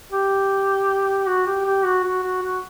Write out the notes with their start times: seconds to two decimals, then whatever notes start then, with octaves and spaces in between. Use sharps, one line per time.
0.12 G4
1.27 F#4
1.47 G4
1.65 G4
1.85 F#4
2.04 F#4
2.23 F#4
2.42 F#4